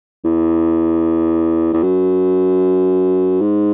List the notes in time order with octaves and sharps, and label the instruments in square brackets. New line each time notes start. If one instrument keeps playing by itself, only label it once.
[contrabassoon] E2
E2
F#2
G#2